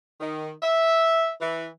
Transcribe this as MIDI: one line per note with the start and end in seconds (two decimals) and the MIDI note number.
0.20 0.49 51
0.63 1.31 76
1.41 1.67 52